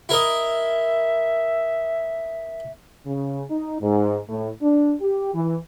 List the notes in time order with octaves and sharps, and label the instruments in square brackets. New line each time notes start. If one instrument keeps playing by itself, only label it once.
[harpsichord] E4 A#4 D#5 [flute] E5
[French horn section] C#3
D#4
G#2
A2
D4
G4
E3